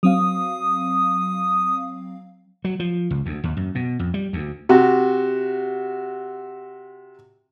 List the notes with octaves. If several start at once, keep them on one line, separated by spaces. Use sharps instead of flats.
F#3 C4 F5 D#6
F#3
F3
C#2
D2
D#2
F#2
B2
F2
G3
D2
C3 F#4